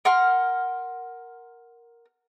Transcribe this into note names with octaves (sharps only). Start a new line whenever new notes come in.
A#4 F#5 C6 F6